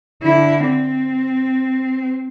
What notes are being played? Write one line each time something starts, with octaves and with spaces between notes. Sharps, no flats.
D3 E4
C4